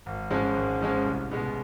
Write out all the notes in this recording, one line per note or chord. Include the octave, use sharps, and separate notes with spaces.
G#1
G#2 F3 G#3 C#4
G#1
G#2 F3 G#3 C#4
C2
B2 G#3 B3